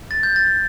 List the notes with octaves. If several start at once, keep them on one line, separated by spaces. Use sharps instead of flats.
A6
G6
A6